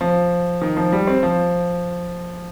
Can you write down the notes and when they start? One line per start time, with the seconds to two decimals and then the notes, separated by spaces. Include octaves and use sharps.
0.01 F3
0.62 D#3
0.77 F3
0.92 G3
1.07 C4
1.23 F3